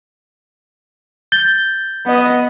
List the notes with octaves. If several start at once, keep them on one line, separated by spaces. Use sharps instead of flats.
G6 A6 G7
B3 D#5